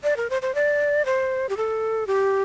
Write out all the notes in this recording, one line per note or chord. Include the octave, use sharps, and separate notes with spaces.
D5
A#4
C5
C5
D5
C5
G4
A4
G4